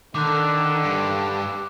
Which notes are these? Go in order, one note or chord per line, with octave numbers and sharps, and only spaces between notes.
D3 D#3 D6 F#6
G2